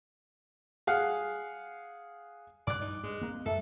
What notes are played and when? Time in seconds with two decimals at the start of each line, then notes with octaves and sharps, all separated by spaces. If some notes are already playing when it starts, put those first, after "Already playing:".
0.87 G#4 F5 F#5
2.67 G2 D5 D6 F#6
2.82 D#4
3.04 G2 G#3
3.22 A#3 C4
3.46 F#2 G3 A#3 A4 E5